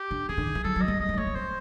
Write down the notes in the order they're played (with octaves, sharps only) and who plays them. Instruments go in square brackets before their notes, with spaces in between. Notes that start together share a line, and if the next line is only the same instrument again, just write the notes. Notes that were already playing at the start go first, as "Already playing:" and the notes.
Already playing: [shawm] G4
[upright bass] D3
[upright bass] C#3 [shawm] G#4
[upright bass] D3
D#3
E3
[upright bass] F#3 [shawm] A4
[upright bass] F#3
[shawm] D#5
[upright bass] G3
[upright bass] F#3 [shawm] D#5
[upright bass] G3
G#3
[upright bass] A3 [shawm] C#5
[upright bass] A#3
[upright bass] C4 [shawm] C5